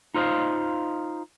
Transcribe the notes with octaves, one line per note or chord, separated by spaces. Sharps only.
D#4 F4 C5 D#5 F5